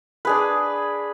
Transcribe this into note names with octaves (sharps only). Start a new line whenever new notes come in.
D4 G#4 B4